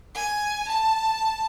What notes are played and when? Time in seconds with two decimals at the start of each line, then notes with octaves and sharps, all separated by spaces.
0.14 G#5
0.68 A5